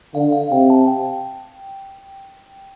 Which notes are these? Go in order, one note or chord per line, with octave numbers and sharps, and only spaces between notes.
D3 F5
F5
C3 G5
A5
G5